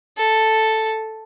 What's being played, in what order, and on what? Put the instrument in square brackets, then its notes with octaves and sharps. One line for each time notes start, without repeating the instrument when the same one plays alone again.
[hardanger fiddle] A4